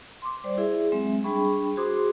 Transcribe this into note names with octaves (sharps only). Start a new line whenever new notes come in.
C6 D6
G3 C5 D5
E4 G#4 E5
F#3 G#3 C4 E5
G3 D4 G#4 G5 B5 C#6
F#4 G#4 C5 C6 D6 D#6